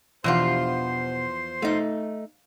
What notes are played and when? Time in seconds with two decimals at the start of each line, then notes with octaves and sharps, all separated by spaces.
0.24 E2 B2 F3 D4 F4 G4 C5 C6
1.62 A3 D#4 F5